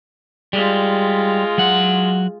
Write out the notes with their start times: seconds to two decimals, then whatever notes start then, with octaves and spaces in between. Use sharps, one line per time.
0.53 G3 G#3 F4
1.58 F#3 F#5